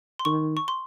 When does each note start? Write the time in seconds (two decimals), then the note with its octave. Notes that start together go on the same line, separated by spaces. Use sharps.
0.19 C6
0.25 D#3 C#6
0.57 C#6
0.68 C6